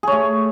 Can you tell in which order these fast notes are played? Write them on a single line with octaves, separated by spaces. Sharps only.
G#4 C#5 A3